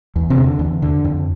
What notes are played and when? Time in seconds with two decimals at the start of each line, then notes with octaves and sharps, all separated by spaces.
0.16 E2
0.30 C3 C4
0.38 D3
0.59 E2
0.82 D3
1.04 F2